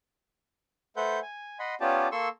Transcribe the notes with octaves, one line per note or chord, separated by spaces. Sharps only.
A3 A4 B4 C5 F#5 G6
G#5
D#5 F#5 B5 C6
B3 C#4 F4 G4 D5 A5
A#3 A4 C6 C#6 E6